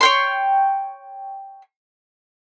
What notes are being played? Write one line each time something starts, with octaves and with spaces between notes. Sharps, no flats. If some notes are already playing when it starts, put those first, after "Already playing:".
C#5 G5 C6